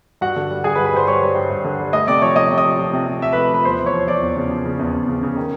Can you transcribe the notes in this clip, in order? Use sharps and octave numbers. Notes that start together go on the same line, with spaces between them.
G2 F#4 F#5
D3
G3
G2 G#4 G#5
B4 B5
G2
B4 B5
G2 C5 C6
G3 C#5 C#6
G3
G2
G2
D3
G3
A3 D#5 D#6
C3 D5 D6
F3 C#5 C#6
C3 D#5 D#6
C3
D#5 D#6
F3
F3
C3
C3
F3 E5 E6
B4 B5
A3
F3 B4 B5
E2 C5 C6
E2
C#5 C#6
F3
F3 D5 D6
E2
C#3
F3
C#3
E2
E2
C#3
C#3
D#3